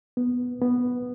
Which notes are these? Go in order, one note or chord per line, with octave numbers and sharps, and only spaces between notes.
B3
B3